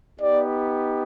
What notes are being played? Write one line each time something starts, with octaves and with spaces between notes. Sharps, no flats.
B3 D#4 G4 D5